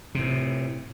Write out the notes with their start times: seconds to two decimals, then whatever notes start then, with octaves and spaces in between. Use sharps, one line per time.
0.15 A2 C3